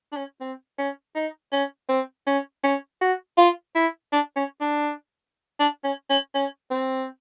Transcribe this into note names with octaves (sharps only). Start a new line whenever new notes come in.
D4
C#4
C4
C#4
D#4
C#4
C4
C#4
C#4
F#4
F4
E4
D4
C#4
D4
D4
C#4
C#4
C#4
C4